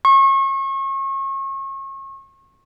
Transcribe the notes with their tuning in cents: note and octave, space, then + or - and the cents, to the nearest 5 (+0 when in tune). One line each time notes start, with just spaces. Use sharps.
C#6 -35